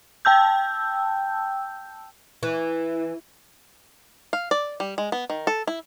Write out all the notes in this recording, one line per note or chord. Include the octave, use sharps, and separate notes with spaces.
G5 A5 E6 G6
E3
F5
D5
G3
G#3
B3
D#3
A4
E4